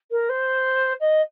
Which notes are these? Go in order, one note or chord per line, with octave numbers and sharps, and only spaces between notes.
A#4
C5
D#5